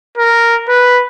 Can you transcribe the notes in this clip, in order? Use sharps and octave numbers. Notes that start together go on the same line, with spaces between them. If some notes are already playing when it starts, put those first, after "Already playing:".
A#4
B4